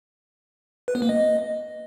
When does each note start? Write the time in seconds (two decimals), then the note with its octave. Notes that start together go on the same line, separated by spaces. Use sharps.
0.88 B4
0.95 B3
1.02 A#3
1.09 D#5